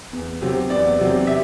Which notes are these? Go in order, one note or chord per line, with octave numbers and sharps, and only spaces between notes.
E2
C3 F#3 C4
E2 D5
C3 F#3 C4
C3 E5